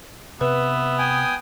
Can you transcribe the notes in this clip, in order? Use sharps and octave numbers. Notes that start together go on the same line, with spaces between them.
C3 B3 B4 E5
G5 G#5 D#6